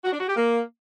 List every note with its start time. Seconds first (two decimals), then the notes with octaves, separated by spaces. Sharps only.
0.04 F#4
0.12 D4
0.20 F#4
0.28 G4
0.36 A#3